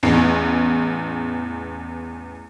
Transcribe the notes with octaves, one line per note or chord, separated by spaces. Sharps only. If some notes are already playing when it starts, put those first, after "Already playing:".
A1 E2